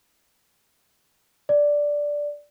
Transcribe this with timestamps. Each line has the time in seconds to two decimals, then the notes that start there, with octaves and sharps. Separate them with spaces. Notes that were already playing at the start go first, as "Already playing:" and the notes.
1.49 D5